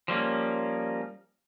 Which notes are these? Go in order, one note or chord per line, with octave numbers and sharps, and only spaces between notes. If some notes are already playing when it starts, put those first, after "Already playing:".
F3 G3 A#3 C#4